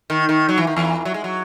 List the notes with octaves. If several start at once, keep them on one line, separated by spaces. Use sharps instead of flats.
D#3
D#3
F#3
E3
D#3
E2 E3
F#3
G#3
F#3